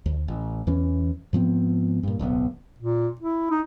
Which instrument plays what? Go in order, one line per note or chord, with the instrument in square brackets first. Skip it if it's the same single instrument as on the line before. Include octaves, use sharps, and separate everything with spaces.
[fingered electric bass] D2
A1
E2 E3 C#4
G#2 F3 B3 C4
G2 A#2
D1 B1 C3 B3
[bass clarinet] A#2
E4
D#4